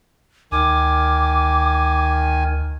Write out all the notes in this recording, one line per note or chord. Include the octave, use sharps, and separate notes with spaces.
D2 D#3 G#5 D6